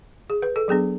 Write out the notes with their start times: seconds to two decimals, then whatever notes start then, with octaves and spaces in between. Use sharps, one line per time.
0.30 G#4
0.42 B4
0.56 A4
0.68 F#3 B3 D4 G#4